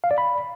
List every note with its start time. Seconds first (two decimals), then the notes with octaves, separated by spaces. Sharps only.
0.04 F5
0.11 D5
0.18 B5